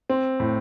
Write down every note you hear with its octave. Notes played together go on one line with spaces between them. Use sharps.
C4
A2